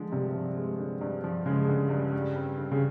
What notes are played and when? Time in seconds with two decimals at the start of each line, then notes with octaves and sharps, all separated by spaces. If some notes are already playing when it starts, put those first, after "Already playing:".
Already playing: D3 F3 G#3
0.12 G2 C3
0.34 F3
0.57 G#3
0.79 D3
1.01 G2
1.24 F3
1.46 C#3 G#3
1.68 D3
1.90 G2
2.13 G3
2.35 C4
2.58 D3
2.72 C#3